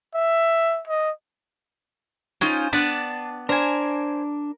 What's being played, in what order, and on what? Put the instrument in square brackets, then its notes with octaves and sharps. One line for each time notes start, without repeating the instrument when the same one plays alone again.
[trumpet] E5
D#5
[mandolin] C#4 D#4 F4 [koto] C5 G5
[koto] B3 B4 D5 [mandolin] D4
[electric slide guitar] D4 [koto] A#4 [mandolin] C5 G#5